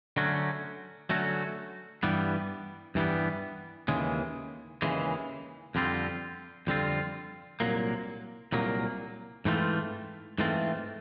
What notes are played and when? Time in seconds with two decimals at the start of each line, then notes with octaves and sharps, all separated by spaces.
0.17 D3 F#3 A3 C#4 F#4
1.10 D3 F#3 A3 C#4 F#4
2.03 G2 E3 G3 B3
2.95 G2 E3 G3 B3
3.88 D#2 C#3 E3 G#3
4.82 D#2 C#3 E3 G#3
5.75 F2 D3 G3 C4 F4
6.67 F2 D3 G3 C4 F4
7.60 C2 A#2 F#3 A#3
8.52 C2 A#2 F#3 A#3
9.45 G#2 E3 A3 C4 F4
10.38 G#2 E3 A3 C4 F4